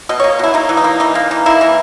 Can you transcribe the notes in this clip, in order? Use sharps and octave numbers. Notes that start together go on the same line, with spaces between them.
B2 D#5
A#3 C#5
B2 E4
A#3 D#4
E3
D#4
A#3
E3 D#4
A#3
E3
A#3 E4
E3